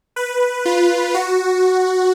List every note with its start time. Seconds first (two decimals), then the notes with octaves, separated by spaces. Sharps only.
0.16 B4
0.65 F4
1.14 F#4